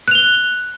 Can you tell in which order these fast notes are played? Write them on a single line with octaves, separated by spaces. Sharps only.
F#6 F7 G7